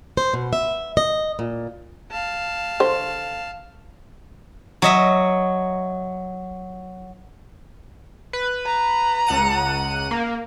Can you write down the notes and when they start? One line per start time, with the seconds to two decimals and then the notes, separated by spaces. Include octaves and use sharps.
0.17 C5
0.34 B2
0.53 E5
0.97 D#5
1.39 A#2
2.11 F5 A5
2.80 D3 C5
4.82 F#3 D#5 E5
8.33 B4
8.66 A#5
9.27 C#2 F#5 D#7
10.11 A#3